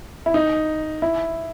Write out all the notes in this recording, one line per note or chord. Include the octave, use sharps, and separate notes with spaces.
E4
D#4
E4